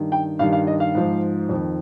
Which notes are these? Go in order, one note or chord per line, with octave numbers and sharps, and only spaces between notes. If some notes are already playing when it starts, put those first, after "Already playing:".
Already playing: G2 D#3
G5
G2 D#3 F5
F5
D#5
F5
G#2 F3
F2 D#3